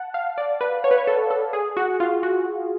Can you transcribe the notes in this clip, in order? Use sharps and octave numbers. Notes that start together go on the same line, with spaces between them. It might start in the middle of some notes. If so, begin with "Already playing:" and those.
Already playing: F#5 A5
F5
D5
B4
C#5
B4
C#5
A4
A4
G#4
F#4
F4
F#4